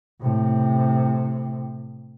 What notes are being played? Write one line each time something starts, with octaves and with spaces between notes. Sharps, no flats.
A2 C3